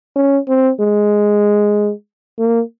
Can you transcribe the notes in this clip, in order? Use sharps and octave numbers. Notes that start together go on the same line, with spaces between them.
C#4
C4
G#3
A#3